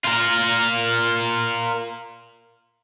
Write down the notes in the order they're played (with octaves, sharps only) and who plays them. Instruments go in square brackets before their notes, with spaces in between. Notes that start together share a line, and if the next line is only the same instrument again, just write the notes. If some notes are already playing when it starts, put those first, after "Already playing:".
[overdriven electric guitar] F4 A#4